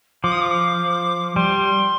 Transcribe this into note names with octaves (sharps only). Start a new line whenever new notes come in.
F3 D6
D#6
D6
G3 C6